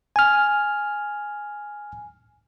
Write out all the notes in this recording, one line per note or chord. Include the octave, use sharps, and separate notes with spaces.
G#5 F6